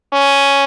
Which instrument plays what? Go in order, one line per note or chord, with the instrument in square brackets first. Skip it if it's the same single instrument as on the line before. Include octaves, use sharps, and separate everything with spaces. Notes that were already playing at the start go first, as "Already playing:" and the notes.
[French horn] C#4